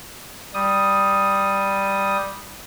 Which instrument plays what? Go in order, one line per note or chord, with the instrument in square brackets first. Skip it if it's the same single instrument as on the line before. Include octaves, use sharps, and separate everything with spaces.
[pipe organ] G3 D#6